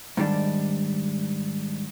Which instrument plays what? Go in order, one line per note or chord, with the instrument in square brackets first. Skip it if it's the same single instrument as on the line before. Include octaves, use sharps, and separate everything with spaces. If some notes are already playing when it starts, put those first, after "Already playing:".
[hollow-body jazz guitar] G#2 D#3 G3 D4